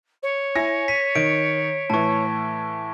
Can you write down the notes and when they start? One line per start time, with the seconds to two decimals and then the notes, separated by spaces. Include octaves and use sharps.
0.23 C#5
0.55 E4 G#5 A#6
0.88 B6 D#7
1.15 D#3 D7
1.90 A2 E3 A5 C#6